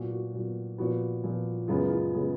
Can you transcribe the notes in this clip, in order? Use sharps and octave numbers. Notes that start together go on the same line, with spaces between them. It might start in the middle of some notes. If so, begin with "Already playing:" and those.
Already playing: A#2 F#3 B3 F#4
F#4
A#2 F#3 B3
A#2 F3 B3 F#4
A#2 F3 B3
F#2 C#3 G#3 B3 F4
F4
C#3 G#3 B3